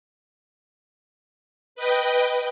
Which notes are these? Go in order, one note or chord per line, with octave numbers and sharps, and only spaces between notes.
B4 D#5 G5